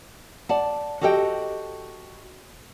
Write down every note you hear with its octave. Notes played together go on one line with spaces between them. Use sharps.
D5 F#5 A5
F#4 G4 A4 D#5 E5 G5